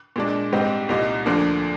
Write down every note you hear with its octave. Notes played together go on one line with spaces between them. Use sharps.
A#2 G#3 D4
G#2 G3 C4 D#4 G4
C2 A#2 G3 A#3 D#4
D2 D3 F3 A#3 D4